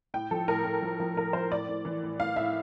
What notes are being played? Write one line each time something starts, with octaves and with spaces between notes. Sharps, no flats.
A2 G5
F3 A4
A2 A#4
A2
F3
F3
A2 A#4
F3 C5
A2 D5
A2
E3
A2
A2 F5
A2 E5